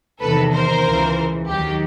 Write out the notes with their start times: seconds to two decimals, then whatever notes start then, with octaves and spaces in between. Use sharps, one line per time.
0.20 E2 C3 D#3 A4 B4
0.52 A#4 C5
0.84 C#2 C#3 E3
1.48 D#2 D#3 F#3 G4